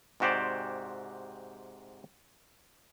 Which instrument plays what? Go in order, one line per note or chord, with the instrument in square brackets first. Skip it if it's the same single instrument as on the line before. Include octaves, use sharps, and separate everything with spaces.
[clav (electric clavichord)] G#2 C3 F#4 G4 C5 D5